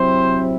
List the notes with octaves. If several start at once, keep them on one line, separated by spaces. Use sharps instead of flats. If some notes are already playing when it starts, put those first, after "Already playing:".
Already playing: C3 F#3 C4 E4 C5